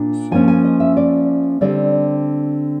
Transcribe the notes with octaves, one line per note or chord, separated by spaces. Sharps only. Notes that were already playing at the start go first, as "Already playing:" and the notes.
Already playing: A#2 D4
F3 A#3 C#4 G#5
G#5
D#5
E5
D5
D3 G3 C4 D5